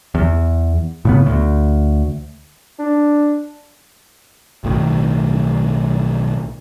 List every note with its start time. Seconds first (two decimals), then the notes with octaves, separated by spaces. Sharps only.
0.15 E2
1.05 A2 C#3 B3
1.26 D2
2.79 D4
4.64 B1 A2 D#3